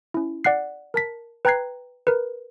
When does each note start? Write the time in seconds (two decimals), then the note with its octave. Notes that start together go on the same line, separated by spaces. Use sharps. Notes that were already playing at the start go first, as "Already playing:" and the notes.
0.14 C#4 E4
0.44 D5 F#5 F#6 C7
0.94 A#4 A5 B6
1.45 B4 G5 A#5 F#6 G#6 C7
2.07 A#4 B4